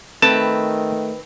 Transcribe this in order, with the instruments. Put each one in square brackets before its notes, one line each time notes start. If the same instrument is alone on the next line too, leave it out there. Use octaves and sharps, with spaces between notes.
[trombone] D#3 [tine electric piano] A3 [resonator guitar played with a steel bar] C4 B4 [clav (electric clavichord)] A5